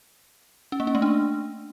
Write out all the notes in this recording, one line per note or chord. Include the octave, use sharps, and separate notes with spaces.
C#4
A#3
C#4
A3
D4